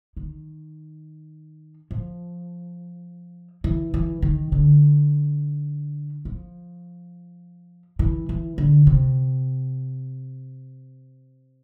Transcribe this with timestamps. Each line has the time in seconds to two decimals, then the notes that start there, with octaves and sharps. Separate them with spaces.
0.17 D#3
1.91 F3
3.64 E3
3.94 E3
4.22 D#3
4.52 D3
6.25 F3
7.99 E3
8.29 E3
8.58 D3
8.87 C3